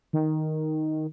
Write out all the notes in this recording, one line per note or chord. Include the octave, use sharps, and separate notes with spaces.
D#3